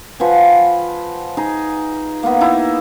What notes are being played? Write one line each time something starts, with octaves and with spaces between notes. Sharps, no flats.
F3 B4 F#5 G#5
D#4 G#4
A#3 B3
D#4 E4